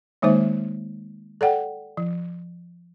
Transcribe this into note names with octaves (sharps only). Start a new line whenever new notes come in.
D#3 G#3 A#3 D#4 C5 E5
A4 D5 F#5 G5
F3